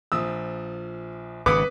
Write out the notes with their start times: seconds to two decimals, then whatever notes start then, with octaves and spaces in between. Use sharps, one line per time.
0.12 A#1 F3 D#6 E6
1.46 G#1 C#3 B4 D6 D#6